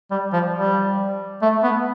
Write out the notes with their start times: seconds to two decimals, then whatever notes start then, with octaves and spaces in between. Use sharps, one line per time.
0.11 G3
0.33 F3
0.55 G3
1.42 A3
1.64 B3